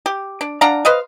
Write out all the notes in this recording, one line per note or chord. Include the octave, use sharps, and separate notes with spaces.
G4
D4
D4 F5 F#5 A#5
B4 C5 D#5 F5